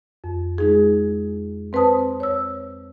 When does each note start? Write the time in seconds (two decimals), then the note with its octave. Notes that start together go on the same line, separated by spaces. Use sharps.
0.24 F2
0.58 G#3 D#4 G#4
1.73 C4 B4 C5 A5 D#6
2.20 C#5 E6